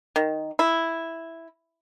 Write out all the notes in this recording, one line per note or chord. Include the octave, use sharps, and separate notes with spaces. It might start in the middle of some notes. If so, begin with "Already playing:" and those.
D#3
E4